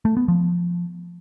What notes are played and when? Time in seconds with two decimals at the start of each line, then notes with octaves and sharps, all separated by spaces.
0.05 A3
0.17 B3
0.28 F3